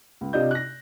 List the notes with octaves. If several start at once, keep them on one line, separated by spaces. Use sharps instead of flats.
C#2
C3 D4 F4 D#5 G6
F#6 A#6